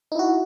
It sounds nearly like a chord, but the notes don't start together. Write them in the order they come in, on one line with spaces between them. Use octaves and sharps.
D#4 E4 F#4